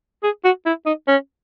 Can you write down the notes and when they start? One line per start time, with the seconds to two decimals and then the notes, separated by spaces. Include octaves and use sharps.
0.23 G#4
0.44 F#4
0.66 E4
0.86 D#4
1.07 C#4